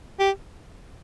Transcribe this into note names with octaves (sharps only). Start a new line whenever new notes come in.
G4